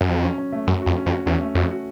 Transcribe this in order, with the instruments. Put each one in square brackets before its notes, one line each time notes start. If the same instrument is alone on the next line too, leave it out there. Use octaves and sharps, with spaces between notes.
[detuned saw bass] F#2
[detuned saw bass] F2 [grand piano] F#3
[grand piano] C#4
C#4
A3
[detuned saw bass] F#2 [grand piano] F#4
[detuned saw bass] F2 [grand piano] F#4
[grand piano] C#4
[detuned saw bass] F2
[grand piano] F#4
[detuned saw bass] E2 [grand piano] C#4
[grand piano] A3
[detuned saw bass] F2 [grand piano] F#4
[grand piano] F#4